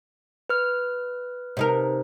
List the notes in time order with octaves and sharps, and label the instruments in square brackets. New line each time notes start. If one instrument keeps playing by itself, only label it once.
[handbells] B4 F6
[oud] C3 D#4 A#4